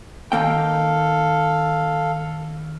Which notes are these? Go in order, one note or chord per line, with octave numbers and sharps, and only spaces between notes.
D#3 A#3 A4 F5 G5